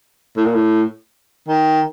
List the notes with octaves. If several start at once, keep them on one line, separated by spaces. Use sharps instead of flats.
A2
A#2
A2
D#3